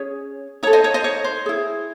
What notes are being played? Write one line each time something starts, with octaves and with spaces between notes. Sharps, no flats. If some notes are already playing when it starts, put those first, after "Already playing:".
Already playing: C#4 G#4 C#5
D#4 A4 C#5
C5 D#5
C#5
C5 D#5
C#5
C5
E4 G#4